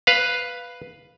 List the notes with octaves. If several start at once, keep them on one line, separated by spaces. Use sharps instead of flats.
B4 F5